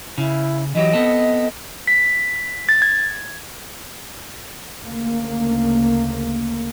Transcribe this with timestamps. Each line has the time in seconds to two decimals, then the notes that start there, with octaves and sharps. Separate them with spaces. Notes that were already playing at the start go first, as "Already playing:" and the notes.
0.18 C#3 E4
0.75 E3 F#3 G4 D#5
0.93 B3 C4 A4
1.87 B6
2.69 A6
2.82 G#6
4.82 D2 C#3 A#3